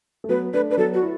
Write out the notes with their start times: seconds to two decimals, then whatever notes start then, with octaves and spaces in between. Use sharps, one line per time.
0.24 A3
0.29 F#3 B3 B4
0.53 A3 D4 B4
0.70 D4 B4
0.77 F#3 B3 A4
0.94 F#4
1.02 E4